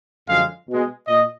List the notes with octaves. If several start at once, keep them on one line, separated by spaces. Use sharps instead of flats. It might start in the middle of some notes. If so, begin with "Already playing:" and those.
F#2 D3 F3 G#3 F5
B2 G#3
A#2 D#5